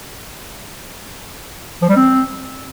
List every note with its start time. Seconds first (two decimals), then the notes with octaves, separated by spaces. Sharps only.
1.82 F3
1.89 G3
1.97 C4